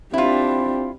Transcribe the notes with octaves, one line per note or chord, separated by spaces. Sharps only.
C4 D4 E4 F4 G4